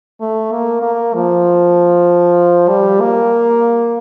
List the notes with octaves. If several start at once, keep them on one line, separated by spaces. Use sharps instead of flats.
A3
A#3
A#3
F3
G3
A#3